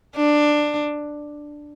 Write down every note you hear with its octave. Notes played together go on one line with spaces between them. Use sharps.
D4